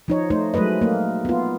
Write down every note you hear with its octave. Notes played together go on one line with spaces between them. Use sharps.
F3 D#4 C#5
A3 D#4 C5
F#3 G#3 A3 B4 D#5
A3 A#3
B3 F4